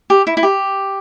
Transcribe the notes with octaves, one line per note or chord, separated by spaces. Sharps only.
G4
E4
E4
G4